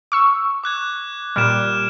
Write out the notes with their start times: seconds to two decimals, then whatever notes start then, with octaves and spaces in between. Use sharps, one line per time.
0.12 C#6 E6
0.64 D6 F#6 G#6
1.36 A#2 G3 F6 D7 E7